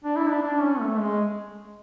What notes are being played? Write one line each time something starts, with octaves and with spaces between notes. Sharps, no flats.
D4
E4
D4
D4
C#4
A3
G#3